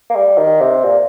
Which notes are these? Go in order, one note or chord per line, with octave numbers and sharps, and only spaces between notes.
A#3
G3
D#3
C3
A#2